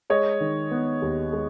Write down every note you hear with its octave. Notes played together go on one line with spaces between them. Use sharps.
G#3 C#5 D#5
D#3
B3
D#2
G#3